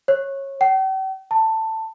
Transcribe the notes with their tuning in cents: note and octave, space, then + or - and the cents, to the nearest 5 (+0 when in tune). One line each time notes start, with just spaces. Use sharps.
C#5 -20
G5 -45
A5 +15